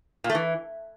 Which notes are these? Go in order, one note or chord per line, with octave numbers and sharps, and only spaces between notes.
A#2
A3
E3